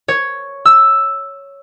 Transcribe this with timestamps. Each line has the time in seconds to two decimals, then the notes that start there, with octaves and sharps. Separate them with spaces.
0.08 C#5
0.65 E6